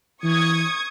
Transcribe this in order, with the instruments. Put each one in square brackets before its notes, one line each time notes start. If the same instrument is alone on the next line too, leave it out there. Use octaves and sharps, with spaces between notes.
[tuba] E3 [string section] C#6 D#6 G#6